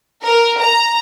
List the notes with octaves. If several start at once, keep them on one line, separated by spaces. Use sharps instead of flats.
A#4
A#5